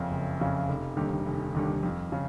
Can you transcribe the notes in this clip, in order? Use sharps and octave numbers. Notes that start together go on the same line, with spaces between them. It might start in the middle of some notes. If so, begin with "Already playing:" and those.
Already playing: F#1 F2 C#3
F#1
F2 C#3
F1
D#2 D3 G3
F1
D#2 D3 G3
F2
C#3